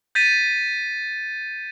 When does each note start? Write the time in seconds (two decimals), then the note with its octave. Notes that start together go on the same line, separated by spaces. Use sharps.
0.15 G6 A6 B6 D#7